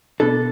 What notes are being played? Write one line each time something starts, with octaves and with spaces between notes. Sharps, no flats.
B2 B3 D4 A4